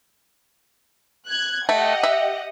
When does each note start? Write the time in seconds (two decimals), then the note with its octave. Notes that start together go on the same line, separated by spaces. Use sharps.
1.28 F#6 G#6
1.69 A3 G4 D#5 F#5
2.03 E5